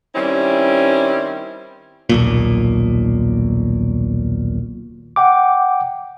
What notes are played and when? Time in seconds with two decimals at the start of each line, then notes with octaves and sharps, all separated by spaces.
0.15 D#3 G3 C4 C#4 E4
2.09 D#1 B1 A#2
5.16 F#5 G5 D6